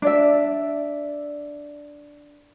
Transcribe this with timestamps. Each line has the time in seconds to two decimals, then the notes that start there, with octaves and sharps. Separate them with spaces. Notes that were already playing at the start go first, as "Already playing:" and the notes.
0.02 D4 D5 E5